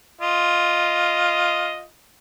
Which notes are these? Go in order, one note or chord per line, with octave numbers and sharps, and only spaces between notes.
F4 D#5